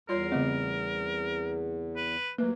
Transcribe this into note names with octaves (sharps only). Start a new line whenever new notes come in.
E2 G3 F4 A#4 C#5 C7
C#3 G3 A3 B3 C4 D#5
B4
D#2 F#3 A3 A#3 B4